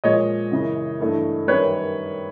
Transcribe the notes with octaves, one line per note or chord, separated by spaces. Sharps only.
A#2 F3 G#3 C#5 D#5
F#2 C#3 E3
G2 E3 A3
F#2 D#3 G3 B4 C#5